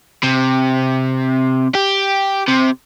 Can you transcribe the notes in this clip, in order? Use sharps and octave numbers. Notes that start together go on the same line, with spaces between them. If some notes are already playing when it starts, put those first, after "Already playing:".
C3
G4
C3